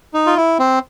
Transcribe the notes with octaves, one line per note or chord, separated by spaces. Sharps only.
D#4
F4
E4
C4